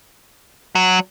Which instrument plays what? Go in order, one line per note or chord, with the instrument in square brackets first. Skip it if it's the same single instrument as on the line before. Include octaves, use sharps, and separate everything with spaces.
[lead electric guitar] F#3